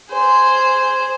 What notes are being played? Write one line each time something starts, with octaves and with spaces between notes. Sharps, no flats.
G#4 C5